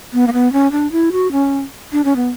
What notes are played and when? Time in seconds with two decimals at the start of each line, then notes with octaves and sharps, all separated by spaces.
0.13 B3
0.27 A#3
0.33 B3
0.53 C#4
0.72 D4
0.92 E4
1.12 F#4
1.32 C#4
1.92 D4
2.05 C#4
2.16 B3